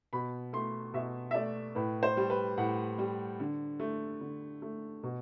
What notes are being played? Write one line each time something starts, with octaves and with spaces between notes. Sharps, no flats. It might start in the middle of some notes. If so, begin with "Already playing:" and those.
B2 B5
A3 C6
B2 E5
E5
A3 D5
A2 B4
C5
G3
B4
A2 F#5
G3
D3
A3
D3
A3
B2